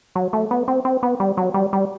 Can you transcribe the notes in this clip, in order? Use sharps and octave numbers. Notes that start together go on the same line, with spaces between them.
F#3
A3
B3
C4
C4
B3
G3
F#3
G3
G3